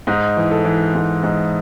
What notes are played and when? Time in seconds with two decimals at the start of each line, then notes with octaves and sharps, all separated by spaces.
0.07 G#2 D#4
0.37 E3
0.51 A4
0.65 E3
0.95 G#2
1.23 G#2